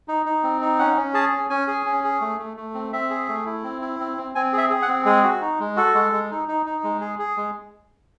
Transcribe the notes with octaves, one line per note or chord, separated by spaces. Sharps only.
D#4
D#4
C4
D#4
C#4 F#5
C#4
G#4 A5
C#4
C#4 G#5
G#4
C#4
G#4
A3
A3
A3
C4
C4 E5
G#4
A3
E4
C4
E4
C4
C4
C4 G#5
G#4
E5
G#4
F#5
C4
G#3 G#4
F#4
D#4
G#3
F#4 A4
G#3
G#3
D#4
D#4
D#4
G#3
G#4
G#4
G#3